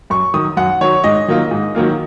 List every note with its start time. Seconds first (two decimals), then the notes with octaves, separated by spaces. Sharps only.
0.10 F#2 C#6
0.34 D#3 F#3 D#6
0.57 F#2 F#5
0.81 D#3 F#3 C#5
1.04 G#2 D#5
1.28 D#3 F#3 A#3 F4
1.51 G#2
1.75 D#3 F#3 A#3 F4